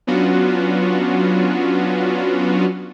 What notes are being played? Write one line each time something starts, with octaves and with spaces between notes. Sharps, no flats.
F#3 B3 C#4 D4 F4 F#4